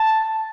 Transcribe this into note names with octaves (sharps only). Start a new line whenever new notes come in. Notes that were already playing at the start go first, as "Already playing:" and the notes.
Already playing: A5